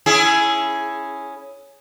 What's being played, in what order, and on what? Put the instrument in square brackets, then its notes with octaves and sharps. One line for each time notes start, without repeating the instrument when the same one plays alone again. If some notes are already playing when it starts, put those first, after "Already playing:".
[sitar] C#4 E4 G#4